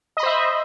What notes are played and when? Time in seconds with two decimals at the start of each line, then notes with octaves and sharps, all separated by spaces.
0.17 D#5
0.20 B5
0.23 C5
0.26 E5